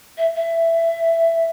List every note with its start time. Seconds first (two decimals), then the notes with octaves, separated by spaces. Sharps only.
0.18 E5
0.36 E5